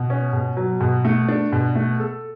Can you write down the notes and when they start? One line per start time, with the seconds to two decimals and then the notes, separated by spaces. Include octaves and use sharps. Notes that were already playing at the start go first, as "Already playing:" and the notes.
Already playing: B2
0.10 C#4
0.33 B2
0.57 F#3
0.80 B2
1.05 A3
1.28 D4
1.52 B2
1.76 A3
2.00 A4